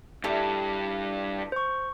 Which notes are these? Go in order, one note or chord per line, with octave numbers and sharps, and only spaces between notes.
G2 G3 E4 A4
C5 C#6